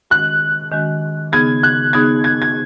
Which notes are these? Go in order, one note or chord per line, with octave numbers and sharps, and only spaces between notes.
D#3 G#3 C#4 F#4 F#6
D#3 G#3 C#4 F#4
C#3 B3 D#4 G#4 G#6
F#6
C#3 B3 D#4 G#4 G#6
G#6
G#6